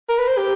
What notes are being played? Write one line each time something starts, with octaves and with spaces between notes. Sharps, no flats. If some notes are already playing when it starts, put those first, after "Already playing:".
A#4
B4
C5
G4